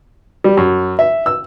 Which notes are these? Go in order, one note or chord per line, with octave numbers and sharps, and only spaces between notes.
G3
F#2
E5
E6